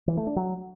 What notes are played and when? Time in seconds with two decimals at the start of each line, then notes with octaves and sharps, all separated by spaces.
0.08 E3
0.17 A3
0.27 D4
0.36 F#3